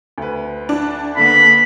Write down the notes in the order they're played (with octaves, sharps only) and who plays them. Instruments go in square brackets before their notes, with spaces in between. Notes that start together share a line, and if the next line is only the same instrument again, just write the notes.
[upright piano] D2 B4
[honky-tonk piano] D4
[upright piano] D3 [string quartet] A#3 B3 [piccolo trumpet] B5